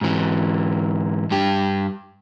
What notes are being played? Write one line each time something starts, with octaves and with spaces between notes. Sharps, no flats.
G#2 E3
G2 G4